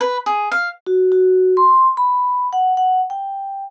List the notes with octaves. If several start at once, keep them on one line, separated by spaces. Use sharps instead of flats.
B4
G#4
F5
F#4
F#4
C6
B5
F#5
F#5
G5